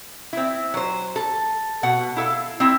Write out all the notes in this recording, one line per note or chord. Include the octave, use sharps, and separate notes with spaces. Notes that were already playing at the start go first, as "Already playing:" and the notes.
C4 E4
F#3 C5
A4
B2 F#5
E4 A4 F5
C4 E4